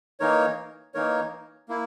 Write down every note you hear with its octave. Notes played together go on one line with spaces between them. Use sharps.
E3 A#3 D#4 A#4 C#5
E3 A#3 D#4 A#4 C#5
A#3 E4